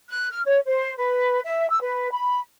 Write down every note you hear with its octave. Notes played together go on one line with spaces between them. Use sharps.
F#6
F6
C#5
C5
B4
E5
E6
B4
B5